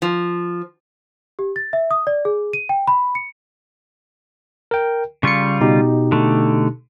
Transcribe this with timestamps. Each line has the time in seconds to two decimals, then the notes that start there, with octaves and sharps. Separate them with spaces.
0.02 F3
1.39 G4
1.56 A6
1.73 E5
1.91 D#6
2.07 D5
2.25 G#4
2.53 D#7
2.69 G5
2.88 B5
3.15 C#7
4.71 A#4 G5
5.23 C#3 G3 F4 C#6 C#7
5.61 B2 D#4 G4
6.12 D3 A3